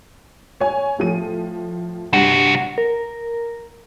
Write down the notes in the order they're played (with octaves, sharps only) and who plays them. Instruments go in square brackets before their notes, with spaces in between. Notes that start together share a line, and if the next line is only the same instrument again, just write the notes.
[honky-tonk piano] C#5 G#5
A2 F3 D#7
[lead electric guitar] C2 F#4 [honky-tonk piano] G2
[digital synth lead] A#4